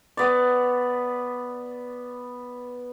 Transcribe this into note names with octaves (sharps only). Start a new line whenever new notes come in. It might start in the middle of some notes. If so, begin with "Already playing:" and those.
B3 D5